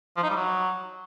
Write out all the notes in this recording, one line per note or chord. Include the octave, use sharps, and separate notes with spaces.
F3
D#4
G3
F#3